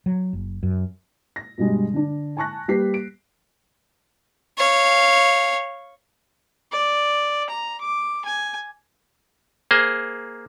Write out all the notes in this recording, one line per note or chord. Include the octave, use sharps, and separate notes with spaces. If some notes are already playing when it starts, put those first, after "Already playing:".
F#3
F#1
F#2
A#6
G2 B2 G3 G#3
D3 D4
G#5 A5 C#6 F#6 A#6
G3 A#3 G4 B4 B6 C7
D7
C#5 F5
D5
A#5
D6
G#5
A#3 G#4 C5